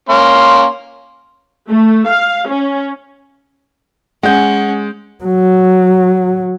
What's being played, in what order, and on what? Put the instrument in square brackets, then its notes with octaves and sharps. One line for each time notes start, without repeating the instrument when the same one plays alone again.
[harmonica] A#3 C#4 C6
[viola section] A3
F5
C#4
[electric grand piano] G#3 G6 [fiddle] C#4 [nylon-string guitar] F#5
[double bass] F#3